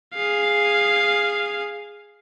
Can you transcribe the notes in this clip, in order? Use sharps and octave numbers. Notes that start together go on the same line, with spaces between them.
G#4 F5